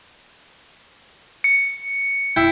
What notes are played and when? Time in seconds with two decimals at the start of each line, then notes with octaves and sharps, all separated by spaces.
1.44 C#7
2.36 E4 G5